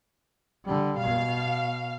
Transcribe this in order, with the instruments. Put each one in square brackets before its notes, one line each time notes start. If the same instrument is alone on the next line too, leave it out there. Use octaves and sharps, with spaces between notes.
[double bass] D3 G3
[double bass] B2 [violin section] F5